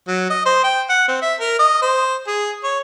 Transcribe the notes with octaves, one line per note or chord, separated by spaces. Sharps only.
F#3
D#5
C5
G5
F#5
C4
E5
A#4
D#5
C5
G#4
C#5